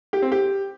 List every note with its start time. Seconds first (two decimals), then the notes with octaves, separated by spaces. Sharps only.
0.13 G4
0.22 C4
0.32 G4